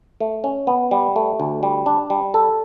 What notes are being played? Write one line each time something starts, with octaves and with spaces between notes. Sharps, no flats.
A3
C#4
B3
G3
A3
D2
G3
D4
G3
A4